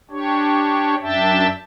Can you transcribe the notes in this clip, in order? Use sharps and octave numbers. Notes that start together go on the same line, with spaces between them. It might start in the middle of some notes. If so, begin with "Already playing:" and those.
D4 G4 C#5
F#2 D4 E5 G5 A5